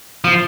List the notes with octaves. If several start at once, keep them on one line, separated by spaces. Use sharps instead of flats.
F3